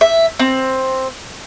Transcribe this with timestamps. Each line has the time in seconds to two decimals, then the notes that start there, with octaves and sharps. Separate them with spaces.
0.01 E5
0.39 C4